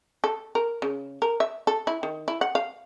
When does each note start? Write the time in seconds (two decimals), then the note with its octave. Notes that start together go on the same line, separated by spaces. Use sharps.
0.24 A4
0.55 A#4
0.82 C#3
1.22 A#4
1.40 E5
1.67 A4
1.87 E4
2.03 D#3
2.28 E4
2.41 F#5
2.55 F5